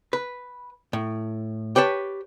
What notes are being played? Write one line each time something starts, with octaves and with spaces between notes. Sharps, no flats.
B4
A2
G4 B4 C#5 A5